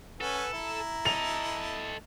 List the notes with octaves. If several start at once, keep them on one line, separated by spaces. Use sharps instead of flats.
C#4 A4 B4 F#5 G#5
E4 A#5
A4 D#5 F7